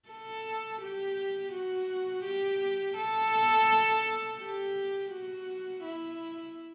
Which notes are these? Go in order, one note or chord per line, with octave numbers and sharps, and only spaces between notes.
A4
G4
F#4
G4
A4
G4
F#4
E4